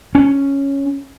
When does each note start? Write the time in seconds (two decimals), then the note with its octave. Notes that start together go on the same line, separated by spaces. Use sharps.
0.15 C#4